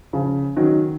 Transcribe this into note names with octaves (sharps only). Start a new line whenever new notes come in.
C#3 F3
D#3 F#3